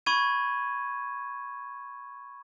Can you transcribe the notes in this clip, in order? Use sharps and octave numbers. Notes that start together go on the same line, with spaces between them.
B5 C#6 G#6 D#7